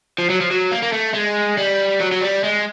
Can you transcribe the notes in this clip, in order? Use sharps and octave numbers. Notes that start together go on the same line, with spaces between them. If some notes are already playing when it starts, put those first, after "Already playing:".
F3
F#3
F3
F#3
A#3
A#3
A3
G#3
G3
F#3
F#3
G3
G#3